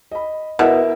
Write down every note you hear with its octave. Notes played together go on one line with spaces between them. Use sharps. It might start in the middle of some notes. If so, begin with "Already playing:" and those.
D#5 B5
B2 E4 A#4 E5